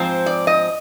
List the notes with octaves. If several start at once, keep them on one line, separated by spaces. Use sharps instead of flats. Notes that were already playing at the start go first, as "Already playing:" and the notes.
Already playing: G#2 F3 C4 C5
D5
D#5